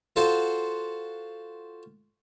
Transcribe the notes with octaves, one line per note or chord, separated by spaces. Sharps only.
F4 F#4 A4 C5 F5 F#5